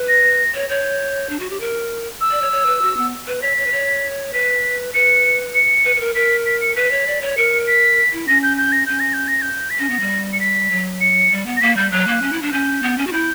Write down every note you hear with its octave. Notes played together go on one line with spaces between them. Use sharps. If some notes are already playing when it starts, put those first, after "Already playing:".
Already playing: B4
A#6
C#5
C#5 G6
D4
F#4
G4
A#4
E6
D5
C#5
C#5
B4
F#4
B3
B4
C#5 B6
C#5
B4
C#5
B4 B6
B4 C#7
C#7
B4
B4
A#4
A#4 B6
B6
C#7
B4 B6
C#5
D5
C#5
A#4 C#7
B6
E4
C#4 A#6
G6
G6
A#6
C#4 G6
A#6
G6
A#6
G6
B6
C#4 A#6
B3
G3
C#7
B6
F#3
C#7
G3
B3
A#6
A#3 B6
G3 G6
F#3 F#6
A#3
C#4
E4
D4
C#4 G6
B3
C#4
F#4
E4 G6